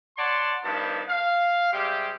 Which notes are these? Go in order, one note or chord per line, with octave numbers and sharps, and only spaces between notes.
C#5 D5 F#5 A5 C6
G2 D#3 F3 B3 A5
F5
C3 G3 G#3 G4